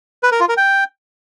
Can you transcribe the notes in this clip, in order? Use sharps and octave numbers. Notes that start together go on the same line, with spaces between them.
B4
A#4
F4
A#4
G5